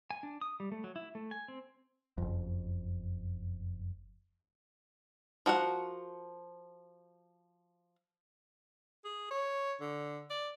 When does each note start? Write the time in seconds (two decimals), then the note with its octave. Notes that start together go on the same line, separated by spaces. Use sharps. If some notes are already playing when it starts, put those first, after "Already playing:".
0.11 G#5
0.23 D4
0.41 D#6
0.60 G3
0.72 A3
0.84 F#3
0.96 E4
1.15 A3
1.31 G#5
1.48 C4
2.18 F#1 F2
5.46 F3 F#4 A#4 F#5
9.04 G#4
9.30 C#5
9.81 D3
10.30 D5